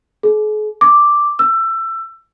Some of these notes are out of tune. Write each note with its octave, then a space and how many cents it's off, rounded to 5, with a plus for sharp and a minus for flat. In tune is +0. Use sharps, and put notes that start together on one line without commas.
G#4 +45
D6 +0
E6 +20